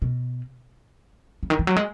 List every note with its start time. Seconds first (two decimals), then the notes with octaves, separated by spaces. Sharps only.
0.02 B2
1.43 C#3
1.50 D#3
1.59 E3
1.67 F#3
1.76 G#3